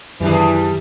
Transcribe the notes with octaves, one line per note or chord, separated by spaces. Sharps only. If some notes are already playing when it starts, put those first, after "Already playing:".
F#2 D#3 E3 G3 D4 G#4